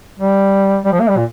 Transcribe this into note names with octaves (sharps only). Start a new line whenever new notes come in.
G3
G3
F3
A#3
G3
A#2